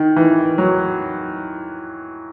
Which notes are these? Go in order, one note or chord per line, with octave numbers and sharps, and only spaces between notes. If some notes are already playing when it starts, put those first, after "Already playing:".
Already playing: D#3
E3
F#3